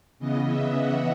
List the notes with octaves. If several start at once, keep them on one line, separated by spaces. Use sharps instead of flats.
C#3 E3 B3 D#5
E5
F#5